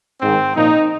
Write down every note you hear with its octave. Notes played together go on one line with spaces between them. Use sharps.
G#2 D#3 C4
A#2 F3 D#4